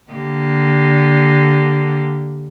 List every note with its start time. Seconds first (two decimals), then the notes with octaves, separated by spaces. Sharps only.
0.12 D3 A#3 G4